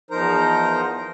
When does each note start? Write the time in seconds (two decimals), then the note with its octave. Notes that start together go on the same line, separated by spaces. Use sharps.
0.11 E2 F3 D#4 A#4 C5 A#5